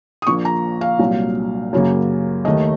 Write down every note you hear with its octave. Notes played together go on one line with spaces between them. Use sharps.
D#6
A#1 A#2 F3 A#3 C#6
A#5
F5
C2 A#2 F#3
F#2 C#3 F#3 A#3
D#2 D#3 A3 D#5